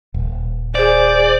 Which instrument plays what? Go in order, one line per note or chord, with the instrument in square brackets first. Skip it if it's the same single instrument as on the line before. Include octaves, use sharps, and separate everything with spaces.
[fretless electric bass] D#1
[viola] G#4 [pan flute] C5 [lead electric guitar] D5